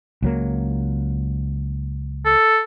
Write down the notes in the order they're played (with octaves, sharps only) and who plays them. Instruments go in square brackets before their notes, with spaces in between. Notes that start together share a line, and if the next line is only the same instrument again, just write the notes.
[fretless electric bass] C#2 F#3 A#3
[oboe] A4